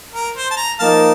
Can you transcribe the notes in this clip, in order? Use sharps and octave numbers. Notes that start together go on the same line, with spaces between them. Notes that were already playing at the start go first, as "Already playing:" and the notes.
A#4
C5
A5
A#5
F3 A#3 D#4 F5 A5